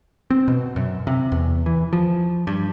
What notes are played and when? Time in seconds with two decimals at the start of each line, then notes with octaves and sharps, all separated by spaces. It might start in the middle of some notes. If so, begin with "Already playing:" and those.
0.30 C4
0.48 B2
0.76 F#2
1.07 C3
1.32 E2
1.66 E3
1.93 F3
2.47 G2